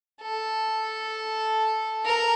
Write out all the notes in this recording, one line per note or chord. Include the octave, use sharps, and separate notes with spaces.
A4
A#4